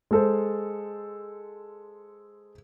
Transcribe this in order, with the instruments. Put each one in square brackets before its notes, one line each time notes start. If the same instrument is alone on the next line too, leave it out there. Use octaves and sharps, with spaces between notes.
[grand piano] G#3 A4 C5